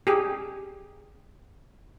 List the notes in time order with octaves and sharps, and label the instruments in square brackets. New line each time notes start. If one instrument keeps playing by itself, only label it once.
[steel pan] G4 G#4